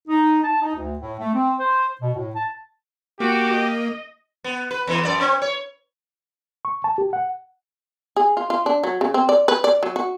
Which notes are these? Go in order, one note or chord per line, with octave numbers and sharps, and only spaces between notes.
D#4
A5
D#4
D2
A2
A3
C4
C5
B2
A2
A5
A#3 F#4 G4 D6
D#5
B3
B4
E2 E3
F#2 D5
C4
C#5
C#6
A5
G4
F#5
G#4
F4
F4
D4
F#3
C#3
C4
D5
B4
D5
F#3
F#4